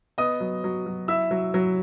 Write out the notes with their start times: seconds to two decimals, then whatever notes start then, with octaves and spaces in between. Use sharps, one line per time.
0.18 B3 D#5 D#6
0.40 F#3
0.64 F#3
0.86 F#3
1.08 E4 E5 E6
1.31 F#3
1.54 F#3